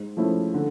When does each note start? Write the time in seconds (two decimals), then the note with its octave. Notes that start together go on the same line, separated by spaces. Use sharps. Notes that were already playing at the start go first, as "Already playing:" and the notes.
Already playing: G#2
0.17 F3 A3 C#4 E4
0.54 D3